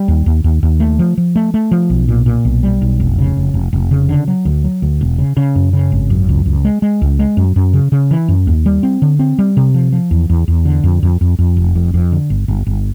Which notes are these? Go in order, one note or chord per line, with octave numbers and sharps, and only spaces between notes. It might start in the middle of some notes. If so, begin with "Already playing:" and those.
Already playing: G3
D#2
D#2
D#2
D#2
A3
F3
F3
A3
A3
F3
B1
A#2
A#2
B1
G3
B1
F1
C#3
F1
F1
F1
C#3
D3
F#3
D2
F#3
D2
E1
C#3
C#3
F#2
C#3
G#1
F#2
C#2
C#2
G#3
G#3
C#2
G#3
F#2
F#2
C#3
C#3
E3
F#2
D#2
G3
C4
D3
C4
G3
C3
F3
F3
E2
E2
E2
D3
F2
F2
F2
F2
F1
F2
F2
D3
G1
G1
G1